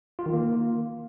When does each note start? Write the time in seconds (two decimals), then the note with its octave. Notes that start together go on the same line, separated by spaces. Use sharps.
0.19 F4
0.26 D#3
0.33 A#3